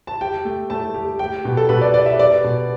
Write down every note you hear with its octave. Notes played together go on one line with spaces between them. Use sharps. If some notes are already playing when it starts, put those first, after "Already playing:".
A5
G4 G5
A3
A3 A5
G4
G4 G5
B2
A4
B2 B4
D5
G4 D5
E5
B3 D5
B2